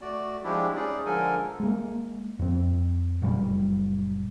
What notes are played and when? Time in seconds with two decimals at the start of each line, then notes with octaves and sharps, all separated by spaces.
0.01 A3 F#4 D5
0.44 F3 G#3 D4 E4 G4
0.75 C#4 D#4 G#4 D5
1.05 D3 F3 G#3 A4 A#4 G#5
1.60 G#3 A#3
2.39 F2 C4
3.22 F#1 A#2 G3